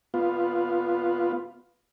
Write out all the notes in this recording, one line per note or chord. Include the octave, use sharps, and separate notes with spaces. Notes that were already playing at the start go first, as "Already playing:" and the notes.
B3 F4